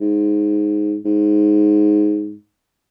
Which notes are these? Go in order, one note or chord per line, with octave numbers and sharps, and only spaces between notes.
G#2
G#2